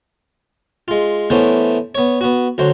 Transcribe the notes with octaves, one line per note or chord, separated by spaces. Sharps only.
G#3 F4
E3 A3 B3 C#4 C5
B3 C#5
B3 F#4
D2 F#3 C5